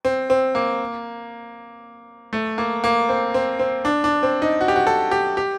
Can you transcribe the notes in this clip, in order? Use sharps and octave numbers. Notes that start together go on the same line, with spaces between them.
C4
C4
A#3
A3
A#3
A#3
C4
C4
C4
D4
D4
C4
D#4
F#4
G4
F#4
A4
G4
G4